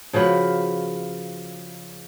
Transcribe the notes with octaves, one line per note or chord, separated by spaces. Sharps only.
C#3 F3 F#4 B4